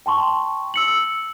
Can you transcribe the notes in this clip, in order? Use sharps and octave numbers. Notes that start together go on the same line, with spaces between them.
G5 A5 C6 C#6
E6 C#7 F#7